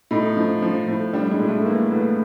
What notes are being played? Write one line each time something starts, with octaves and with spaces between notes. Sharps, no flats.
A2 D#4
F3
F3
A2
G3 D4
G#3
A2
A3
E3 A#3
A2 B3